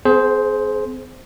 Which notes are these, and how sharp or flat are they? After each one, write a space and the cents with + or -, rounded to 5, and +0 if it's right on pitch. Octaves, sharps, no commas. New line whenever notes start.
C4 -45 G#4 +30 C5 +0